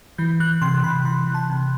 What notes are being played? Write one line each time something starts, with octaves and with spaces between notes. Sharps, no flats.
E3 G6
E3 F#6
C3 C6
C3 B5
E3 B5
E3
A5
C3